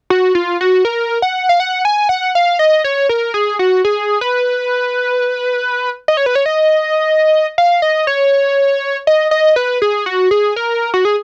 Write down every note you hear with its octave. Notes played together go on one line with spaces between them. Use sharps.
F#4
F4
F#4
A#4
F#5
F5
F#5
G#5
F#5
F5
D#5
C#5
A#4
G#4
F#4
G#4
B4
D#5
C#5
B4
C#5
D#5
F5
D#5
C#5
D#5
D#5
B4
G#4
F#4
G#4
A#4
F#4
G#4